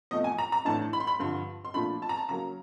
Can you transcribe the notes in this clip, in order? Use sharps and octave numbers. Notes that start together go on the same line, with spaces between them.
E2 C3 F3 A3 D#5
G#5
A#5
A#5
A2 E3 A3 D4 A5
B5
C6
B5
G2 D3 F3 C6
C6
A#2 F3 A3 D4 B5
A5
A#5
A5
C#3 F#3 A#3 A#5